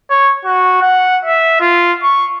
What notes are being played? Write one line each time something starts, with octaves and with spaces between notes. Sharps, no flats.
C#5
F#4
F#5
E5
F4
C#6